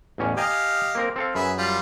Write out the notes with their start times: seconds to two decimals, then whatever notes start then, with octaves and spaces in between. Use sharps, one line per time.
0.18 A1 E2 C#4
0.37 G4 D#5 F5 G5 G#5 A#5
0.95 A#3 C4 A#4
1.16 C4 A4 F5
1.35 F#2 G#4 B4 E5
1.58 G3 F4